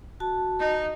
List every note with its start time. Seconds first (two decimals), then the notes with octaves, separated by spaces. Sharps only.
0.20 F#4 A5
0.60 D#4